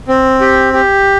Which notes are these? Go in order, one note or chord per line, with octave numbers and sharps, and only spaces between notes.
C4
G4
G4